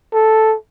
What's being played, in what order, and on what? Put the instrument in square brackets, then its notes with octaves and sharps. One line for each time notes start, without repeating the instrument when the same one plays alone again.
[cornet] A4